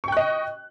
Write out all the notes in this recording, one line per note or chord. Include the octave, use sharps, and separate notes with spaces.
D#5 G5 C#6 F#6